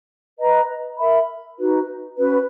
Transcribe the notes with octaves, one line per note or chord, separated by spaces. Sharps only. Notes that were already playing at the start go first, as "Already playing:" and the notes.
B4 D#5 A#5
A#4 E5 B5
D#4 F#4 B4
C#4 F#4 B4